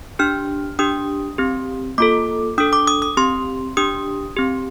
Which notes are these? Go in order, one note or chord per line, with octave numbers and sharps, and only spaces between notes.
D4 G4 F6
D4 G4 D#6
C4 G4
A#3 F4 A4 D6
D4 A4 D#6
D6
D#6
D#6
C4 G4 C6
D4 G4 D#6
C4 G4